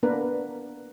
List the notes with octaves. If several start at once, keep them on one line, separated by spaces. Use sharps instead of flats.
A#3 B3 D4 A#4 B4